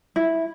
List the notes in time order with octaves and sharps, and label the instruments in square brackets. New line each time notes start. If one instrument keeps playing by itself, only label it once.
[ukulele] E4